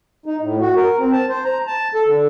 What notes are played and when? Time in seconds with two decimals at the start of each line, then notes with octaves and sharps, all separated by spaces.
0.26 D#4
0.41 A2
0.60 F#4
0.76 A#4
0.99 C4
1.12 A5
1.29 C5
1.44 A#5
1.67 A5
1.95 A4
2.07 D3